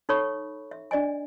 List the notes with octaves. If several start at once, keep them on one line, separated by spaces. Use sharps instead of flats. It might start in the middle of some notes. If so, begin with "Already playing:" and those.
D#4 A4 C#5 B5 C#6
E5
D4 D5 D#5 G#5